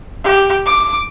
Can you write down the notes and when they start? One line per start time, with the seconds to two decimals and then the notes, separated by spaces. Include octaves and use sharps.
0.24 G4
0.66 D6